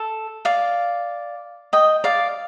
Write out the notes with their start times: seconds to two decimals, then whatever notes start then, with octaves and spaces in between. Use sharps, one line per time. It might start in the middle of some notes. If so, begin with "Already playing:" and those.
Already playing: A4
0.45 D5 F5
1.73 D#5 G5
2.04 D5 F5